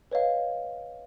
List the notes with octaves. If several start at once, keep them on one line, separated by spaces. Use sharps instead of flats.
B4 C#5 D#5 F5